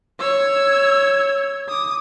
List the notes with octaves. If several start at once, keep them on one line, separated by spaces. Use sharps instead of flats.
C#5 E6 G#6
D6 D#6